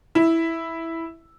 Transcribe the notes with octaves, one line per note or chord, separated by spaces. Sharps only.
E4